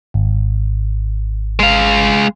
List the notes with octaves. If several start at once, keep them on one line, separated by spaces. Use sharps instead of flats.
G#1
G#3 F5